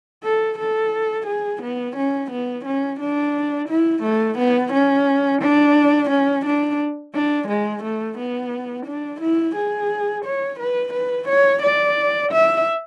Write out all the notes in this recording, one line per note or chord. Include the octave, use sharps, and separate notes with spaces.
A4
A4
G#4
B3
C#4
B3
C#4
D4
E4
A3
B3
C#4
D4
C#4
D4
D4
G#3
A3
B3
D4
E4
G#4
C#5
B4
B4
C#5
D5
E5